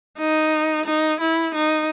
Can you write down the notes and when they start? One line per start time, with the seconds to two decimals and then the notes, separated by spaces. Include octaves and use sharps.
0.18 D#4
0.86 D#4
1.21 E4
1.55 D#4